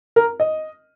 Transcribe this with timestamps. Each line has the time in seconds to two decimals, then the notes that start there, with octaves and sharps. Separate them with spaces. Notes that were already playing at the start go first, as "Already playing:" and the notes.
0.16 A#4
0.40 D#5